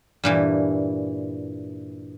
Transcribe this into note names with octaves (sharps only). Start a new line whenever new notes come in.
G2 A#2 E3